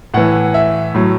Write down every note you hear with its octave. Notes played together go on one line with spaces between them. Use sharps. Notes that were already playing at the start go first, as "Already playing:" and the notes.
A2 E3 F#5
E5
A2 F#3